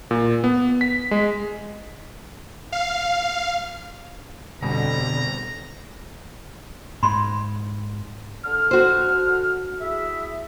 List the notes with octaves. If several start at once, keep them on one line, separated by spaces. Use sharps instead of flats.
A#2
B3
B6
G#3
F5
F2 B2 D3 G3 A#5
G#2 B5 C6
D3 A4 F6
F#4 C5
E4 G#4 E5